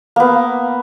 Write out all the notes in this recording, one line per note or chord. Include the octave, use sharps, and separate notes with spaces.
A#3 B3